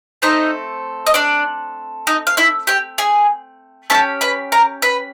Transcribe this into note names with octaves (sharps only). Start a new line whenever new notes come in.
A3 C4 D#4 A4 D#5
D#5
D4 D5
D#4 D#5
F5
E4 E5
G4 G5
G#4 G#5
C#4 E4 G4 A4 A5
B4 B5
A#4 A#5
B4 B5